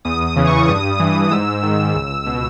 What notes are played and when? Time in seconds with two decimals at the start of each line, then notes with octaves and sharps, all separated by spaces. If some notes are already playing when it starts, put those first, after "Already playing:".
0.05 E2 D#6
0.25 D#6
0.36 C#3 E3
0.47 C#6
0.68 G2 D#6
1.00 E3
1.31 G#2 E6
1.63 D#3
1.95 C#2
2.26 B2